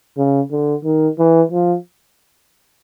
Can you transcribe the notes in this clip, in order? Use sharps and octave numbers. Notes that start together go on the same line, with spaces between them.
C#3
D3
D#3
E3
F3